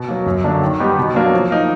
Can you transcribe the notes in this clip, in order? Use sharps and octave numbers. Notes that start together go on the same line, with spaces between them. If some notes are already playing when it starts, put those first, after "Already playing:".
Already playing: B2
F#3 A#3
F#2
D3 F#3 A#3 D4
D#3
G3 B3 D#4 G4
B2
F#3 A#3 D4
F3
A#3 D#4